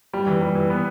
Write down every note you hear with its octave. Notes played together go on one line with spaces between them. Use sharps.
G3
E3
G3
E3
B3